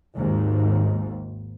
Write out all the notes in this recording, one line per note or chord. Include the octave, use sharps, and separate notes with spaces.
G#1 D#2 G#2